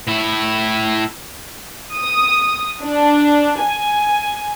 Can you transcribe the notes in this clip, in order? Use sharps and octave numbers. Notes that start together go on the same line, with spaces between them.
A2 E4
D#6
D4
G#5